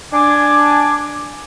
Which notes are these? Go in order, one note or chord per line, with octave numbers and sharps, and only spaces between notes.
D4 G#5 D6